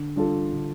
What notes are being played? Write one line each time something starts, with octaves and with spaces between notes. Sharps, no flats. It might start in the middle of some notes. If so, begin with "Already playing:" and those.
Already playing: D3
G3 D4 F4 A4
D3